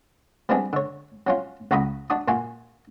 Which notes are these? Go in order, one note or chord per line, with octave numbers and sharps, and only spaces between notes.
F3 G3 B3 C4 D4 G#4
D3 C#5
F#3 C#4 F4
C#2 F#4 A#5 B5 D#6
D4 F#4 D#6
A#2 F4 F#4 G#5